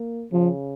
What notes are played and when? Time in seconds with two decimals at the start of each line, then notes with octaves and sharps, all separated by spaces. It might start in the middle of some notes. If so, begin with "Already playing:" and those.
Already playing: A#3
0.32 C#3 F3